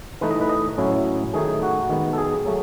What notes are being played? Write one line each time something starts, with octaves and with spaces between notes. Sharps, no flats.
E3 A3 D#4 B4
D#5
B4
D#5
A2 F#3 C#4 E4
D#3 A3 D#4 G#4
F#4
D#3 G#3 B3
A4
G#4
F#3 A3